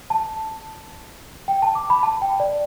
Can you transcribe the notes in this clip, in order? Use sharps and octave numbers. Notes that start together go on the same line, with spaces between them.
A5
G5
A5
D6
B5
A5
G5
D5